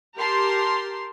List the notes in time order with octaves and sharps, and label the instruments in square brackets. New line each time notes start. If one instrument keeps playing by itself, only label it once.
[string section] G4 A#4 A5 C6